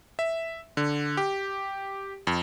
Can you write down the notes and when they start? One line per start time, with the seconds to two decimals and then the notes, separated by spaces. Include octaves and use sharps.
0.19 E5
0.77 D3
1.17 G4
2.27 F2